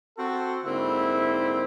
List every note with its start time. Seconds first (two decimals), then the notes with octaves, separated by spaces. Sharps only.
0.18 C4 F#4 A4
0.65 G#2 D3 A#3 C4 E4